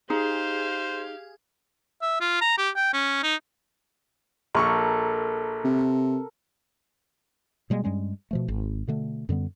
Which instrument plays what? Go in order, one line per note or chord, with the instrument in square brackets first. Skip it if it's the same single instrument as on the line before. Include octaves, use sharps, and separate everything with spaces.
[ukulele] D#4 [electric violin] G4 F5 [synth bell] G#4 [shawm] C5
[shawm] E5
F4
A#5
G4
G5
C#4
D#4
[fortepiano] A#1 C#6 [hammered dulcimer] A4 A#4
[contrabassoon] C3
[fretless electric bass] B2 G3 G#3 A#3
G2 G3 G#3 C#4
B2 F3 A3
G#1
B2 D3 A3
F#2 D3 G3 B3